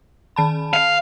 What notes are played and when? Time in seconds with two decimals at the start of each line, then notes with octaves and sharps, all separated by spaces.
0.36 D#3 A5 B5
0.73 F5